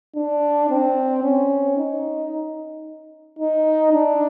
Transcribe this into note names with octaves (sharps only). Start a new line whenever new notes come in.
D4
C4
C#4
D#4
D#4
D4